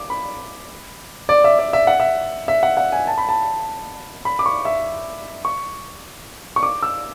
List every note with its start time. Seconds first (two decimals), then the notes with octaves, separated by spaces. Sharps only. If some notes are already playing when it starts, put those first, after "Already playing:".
Already playing: D6
0.10 B5
1.29 D5
1.44 E5
1.59 D5
1.73 E5
1.87 F#5
2.00 E5
2.48 E5
2.63 F#5
2.77 F#5
2.92 G#5
3.07 A5
3.18 B5
3.29 A5
4.25 B5
4.39 D6
4.46 C#6
4.65 E5
5.45 C#6
6.56 C#6
6.63 D6
6.83 E6